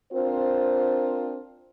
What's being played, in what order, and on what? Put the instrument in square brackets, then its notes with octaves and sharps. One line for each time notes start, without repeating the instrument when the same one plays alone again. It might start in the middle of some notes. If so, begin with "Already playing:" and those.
[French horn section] C4 D4 F4 A#4 C5